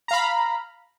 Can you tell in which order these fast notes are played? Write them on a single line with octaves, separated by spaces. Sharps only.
A#5 F5 B5